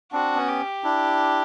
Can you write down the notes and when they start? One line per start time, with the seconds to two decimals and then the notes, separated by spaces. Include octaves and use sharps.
0.12 C4 D4 F#4
0.36 B3 C#4
0.48 G4
0.84 D4 E4